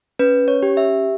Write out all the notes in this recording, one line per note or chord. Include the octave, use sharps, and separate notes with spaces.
C#4 B4
C#5
G4
E5